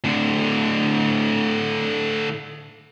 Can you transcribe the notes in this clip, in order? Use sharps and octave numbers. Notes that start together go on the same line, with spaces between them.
A2 D3